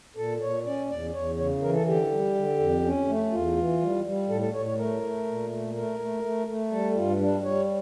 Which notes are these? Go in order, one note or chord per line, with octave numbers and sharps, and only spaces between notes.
A#2 A4
A#2 C#5
C#4 D5
E2 D5
E2 C#5
C#3 C#5
E3 A#4
A4
D3 G4
G3
D3
F2
C#4
A3
E2 F4
E3
G3
G3
A2 A4
A4
A2 C#5
C#5
A3 A#4
A3
A#2
A3
A3 A#4
A3
A3
A3
G3 A4
G2 F4
G3 D4
G3 C#5